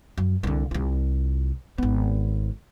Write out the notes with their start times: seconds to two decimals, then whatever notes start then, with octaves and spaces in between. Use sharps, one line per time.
0.18 F#2
0.43 C2 D3
0.71 C2 F4
1.78 G#1 B3